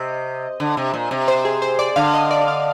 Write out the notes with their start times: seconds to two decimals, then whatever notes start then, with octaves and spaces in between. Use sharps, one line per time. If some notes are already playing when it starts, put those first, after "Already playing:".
Already playing: C3 D#5
0.60 D3
0.77 C3
0.94 A#2
1.11 C3
1.28 C5
1.45 G#4
1.62 C5
1.79 D5
1.96 D3 F5
2.13 D#5
2.31 D5
2.48 F5